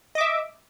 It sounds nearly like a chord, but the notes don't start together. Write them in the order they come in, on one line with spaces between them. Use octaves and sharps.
D#5 D6 E5